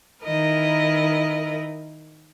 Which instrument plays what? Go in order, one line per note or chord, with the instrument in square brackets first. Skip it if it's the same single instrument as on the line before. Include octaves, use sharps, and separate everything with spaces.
[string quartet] D#3 E4 A#4 B4 D#5